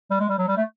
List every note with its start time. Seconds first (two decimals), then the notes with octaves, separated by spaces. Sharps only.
0.11 G3
0.20 G#3
0.29 G3
0.39 F#3
0.48 G3
0.57 A3